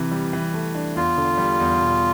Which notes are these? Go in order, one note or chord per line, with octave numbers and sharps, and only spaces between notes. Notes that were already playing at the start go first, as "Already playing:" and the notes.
Already playing: C3 E3
G3
E3
A3
D4
E2 F4
D3
G3
E2
B2